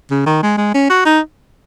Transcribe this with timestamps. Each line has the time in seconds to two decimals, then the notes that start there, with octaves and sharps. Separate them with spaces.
0.11 C#3
0.26 D#3
0.43 G#3
0.58 G#3
0.74 C#4
0.90 F#4
1.06 D#4